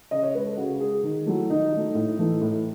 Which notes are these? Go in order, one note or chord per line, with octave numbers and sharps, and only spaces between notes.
C#3 D#5
C#5
G#3 B4
A4
C#3 F#4
G#3 G#4
D#3
F#3 A3 E4
D#3 D#4
F#3 A3
A2
E3 A3
A2